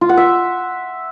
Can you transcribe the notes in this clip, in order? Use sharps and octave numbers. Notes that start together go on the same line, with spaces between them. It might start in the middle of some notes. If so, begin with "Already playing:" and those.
F4
F#5
E5